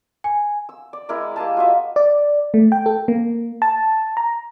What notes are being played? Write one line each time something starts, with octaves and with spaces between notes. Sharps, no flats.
G#5
E6
D5
G#3 E4 A#4 D5
A#3 G4 G#4 A5
F4 F#4 D#5 E5
D5
A3
G5
A4
A#3
A5
A#5